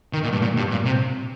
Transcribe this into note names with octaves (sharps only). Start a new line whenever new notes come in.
D#3
A#2
G2
A#2
G2
A#2
C3